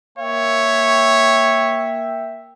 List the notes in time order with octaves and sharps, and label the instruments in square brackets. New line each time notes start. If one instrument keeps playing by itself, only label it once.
[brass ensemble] A#3 E5 G5 [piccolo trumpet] C#5